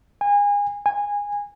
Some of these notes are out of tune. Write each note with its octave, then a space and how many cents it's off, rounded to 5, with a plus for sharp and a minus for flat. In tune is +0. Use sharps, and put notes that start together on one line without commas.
G#5 -30
G#5 -20